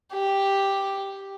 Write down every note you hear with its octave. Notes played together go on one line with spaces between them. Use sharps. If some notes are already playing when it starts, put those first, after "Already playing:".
G4